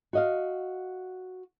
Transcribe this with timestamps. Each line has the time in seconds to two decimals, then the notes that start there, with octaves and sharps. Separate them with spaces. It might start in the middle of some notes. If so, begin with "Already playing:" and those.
0.13 F#4 D#5 F5